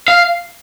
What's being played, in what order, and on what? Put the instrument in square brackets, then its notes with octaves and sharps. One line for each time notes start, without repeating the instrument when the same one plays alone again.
[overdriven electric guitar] F5